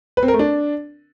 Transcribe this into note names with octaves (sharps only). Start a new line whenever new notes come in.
B4
C4
A#4
A3
D4